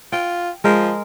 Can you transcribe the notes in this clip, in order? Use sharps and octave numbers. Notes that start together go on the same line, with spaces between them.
F4 G5
F3 G#3 A#4